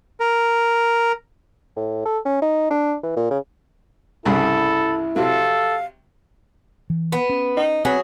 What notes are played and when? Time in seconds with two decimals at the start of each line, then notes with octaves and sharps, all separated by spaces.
0.20 A#4
1.76 A2
2.05 A4
2.25 C#4
2.42 D#4
2.70 D4
3.03 E3
3.16 A#2
3.30 C#3
4.25 C2 G2 C#3 E4 A4 B5
5.16 C3 F#3 A4 F5
6.90 E3
7.12 B3
7.29 C#4
7.57 D#4
7.85 F#3 B3 C4 G#4